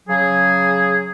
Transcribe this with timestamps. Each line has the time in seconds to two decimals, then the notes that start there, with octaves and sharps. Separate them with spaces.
0.08 C#3 F#3 G#4